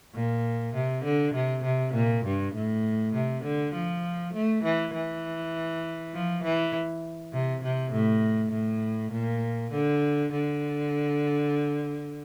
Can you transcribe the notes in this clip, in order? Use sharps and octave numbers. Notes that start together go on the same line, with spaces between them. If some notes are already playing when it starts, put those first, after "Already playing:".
A#2
C3
D3
C3
C3
A#2
G2
A2
C3
D3
F3
A3
E3
E3
F3
E3
C3
C3
A2
A2
A#2
D3
D3